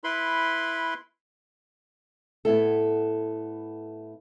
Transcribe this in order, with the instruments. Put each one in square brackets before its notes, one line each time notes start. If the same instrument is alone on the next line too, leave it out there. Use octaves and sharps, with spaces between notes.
[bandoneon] E4 B4 B5 C6
[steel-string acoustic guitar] A2 B3 E4 A4